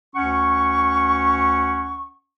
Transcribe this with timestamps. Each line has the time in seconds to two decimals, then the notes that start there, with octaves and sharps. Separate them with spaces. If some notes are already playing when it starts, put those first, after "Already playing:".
0.16 D2 C#4 F#5 C#6